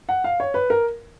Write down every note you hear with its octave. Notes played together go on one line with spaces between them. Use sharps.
F#5
F5
C#5
B4
A#4